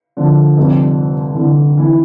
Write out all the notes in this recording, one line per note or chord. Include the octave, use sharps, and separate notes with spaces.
D3 F3
F1 F2 C3 G3
E3
D3
E3